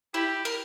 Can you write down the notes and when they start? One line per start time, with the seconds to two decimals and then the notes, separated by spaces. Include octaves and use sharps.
0.14 E4 G4
0.45 A#4